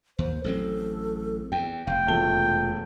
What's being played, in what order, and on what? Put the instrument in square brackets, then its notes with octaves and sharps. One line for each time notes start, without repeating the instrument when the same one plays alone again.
[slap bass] D#2 [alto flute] C5
[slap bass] A1 F#3 C4 [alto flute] A4
[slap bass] E2 [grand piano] G5
[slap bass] F1 [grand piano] F5 [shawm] G5
[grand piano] E1 A3 G7 [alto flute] F4